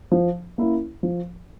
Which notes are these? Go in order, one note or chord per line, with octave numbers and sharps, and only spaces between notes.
F3
A#3 C#4 E4
F3